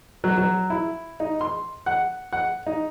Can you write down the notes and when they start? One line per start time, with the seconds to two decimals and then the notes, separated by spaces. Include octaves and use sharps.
0.24 F#3
0.38 F#3
0.70 E4
1.20 D#4
1.41 C6
1.86 F#5
2.33 F#5
2.67 D#4